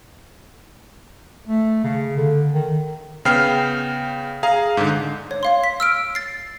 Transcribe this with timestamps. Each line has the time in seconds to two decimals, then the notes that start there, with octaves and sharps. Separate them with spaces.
1.47 A3
1.84 C#3
2.17 D3
2.52 D#3
3.25 C#3 B3 G5 F6 C7
4.43 G#4 F5 A#5
4.77 G#2 D3
5.31 C#5
5.43 C#5 F5 C6
5.64 B6
5.80 E6 F6 D7
6.15 A6 C7